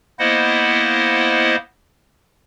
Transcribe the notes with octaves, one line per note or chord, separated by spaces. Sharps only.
A#3 B3 E4 C5 D#5 F#5